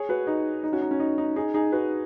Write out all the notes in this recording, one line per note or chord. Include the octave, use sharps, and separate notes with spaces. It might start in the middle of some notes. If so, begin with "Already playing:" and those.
Already playing: G#4 C#5
F#4 B4
D#4 G#4
D#4
C#4 F#4
D#4
C#4
D#4
D#4
D#4 G#4
D#4 G#4
F#4 B4